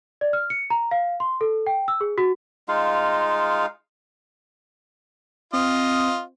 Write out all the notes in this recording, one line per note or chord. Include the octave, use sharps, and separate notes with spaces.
D5
F6
C#7
A#5
F5
C6
A4
G5
E6
G#4
F#4
G#3 D#4 F4 F5
C4 F4 D#5